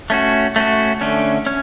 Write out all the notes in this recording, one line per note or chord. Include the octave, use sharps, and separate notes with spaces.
A3 C#4 F#4
A3 C#4 F#4
D3 A3 C#4
C#4